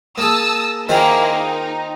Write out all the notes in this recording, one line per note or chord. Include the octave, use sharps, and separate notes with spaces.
A#3 G#4 A5 D#6 E6
D#3 A#3 C4 E4 F4 G#4
D#4